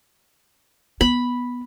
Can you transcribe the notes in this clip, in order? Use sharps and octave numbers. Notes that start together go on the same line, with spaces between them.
B3 B5